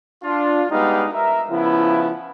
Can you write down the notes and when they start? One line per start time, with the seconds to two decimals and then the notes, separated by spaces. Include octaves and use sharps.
0.23 D4 F4
0.70 G3 G#3 B3 D#4 G4 F5
1.12 A#4 E5
1.49 C#3 F3 B3 E4